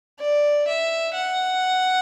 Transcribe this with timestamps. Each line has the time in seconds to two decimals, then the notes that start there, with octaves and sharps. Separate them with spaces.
0.19 D5
0.68 E5
1.14 F#5